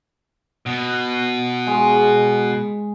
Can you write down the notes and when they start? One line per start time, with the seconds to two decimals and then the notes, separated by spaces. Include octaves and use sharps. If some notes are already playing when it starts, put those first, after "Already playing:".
0.66 B2
1.67 G#3